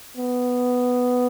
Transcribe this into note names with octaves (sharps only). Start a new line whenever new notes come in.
B3